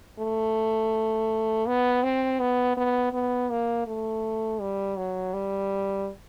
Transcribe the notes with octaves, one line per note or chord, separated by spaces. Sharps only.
A3
B3
C4
B3
B3
B3
A#3
A3
G3
F#3
G3